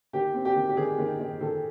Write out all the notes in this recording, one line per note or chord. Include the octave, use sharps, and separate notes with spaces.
D#3 G4
C4
G4
D#3
G4
D#3 G#4
D#3
D#3
D#3 A4